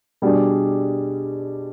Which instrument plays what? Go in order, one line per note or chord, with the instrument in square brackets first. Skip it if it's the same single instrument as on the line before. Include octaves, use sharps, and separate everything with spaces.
[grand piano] B2 G3 D4 G#4